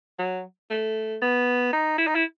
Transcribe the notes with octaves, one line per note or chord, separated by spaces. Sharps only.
F#3
A3
B3
D#4
E4
D#4
E4